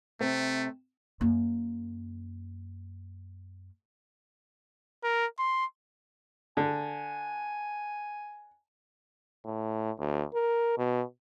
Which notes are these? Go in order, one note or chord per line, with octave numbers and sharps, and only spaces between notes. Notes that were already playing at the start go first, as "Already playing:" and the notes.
C3 A3 C4
F#2 A#3
A#4
C6
D3 G#5
A2
D2
A#4
B2